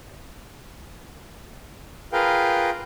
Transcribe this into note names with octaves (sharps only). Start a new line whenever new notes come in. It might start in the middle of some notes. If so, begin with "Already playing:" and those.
F4 G#4 A#4 B4 F5 G5